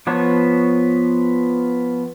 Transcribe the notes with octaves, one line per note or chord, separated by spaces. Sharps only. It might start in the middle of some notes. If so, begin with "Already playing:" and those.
F3 B3 C#5 A5